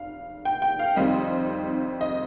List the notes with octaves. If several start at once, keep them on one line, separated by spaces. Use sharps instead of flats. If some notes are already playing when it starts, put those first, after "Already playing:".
Already playing: F1 F5
G5
G5
F5
F2 D#3 G3 C4 D#5
D#5